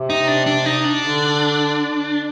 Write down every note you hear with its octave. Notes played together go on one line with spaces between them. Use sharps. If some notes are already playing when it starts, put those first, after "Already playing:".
Already playing: C3
D#4
D4
D4
D#4
D4
D3